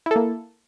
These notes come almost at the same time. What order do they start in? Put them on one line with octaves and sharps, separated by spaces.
E4 A4 A#3